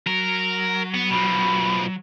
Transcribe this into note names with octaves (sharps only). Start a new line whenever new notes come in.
F#3 A#4
B3
B2 F3 B5